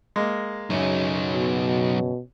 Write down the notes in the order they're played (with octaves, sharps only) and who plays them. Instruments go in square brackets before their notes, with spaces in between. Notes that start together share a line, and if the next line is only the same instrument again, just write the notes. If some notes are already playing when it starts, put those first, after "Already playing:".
[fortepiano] G#3 A#3
[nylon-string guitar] F#2 C#3 [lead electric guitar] F#3 D#4
[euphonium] B2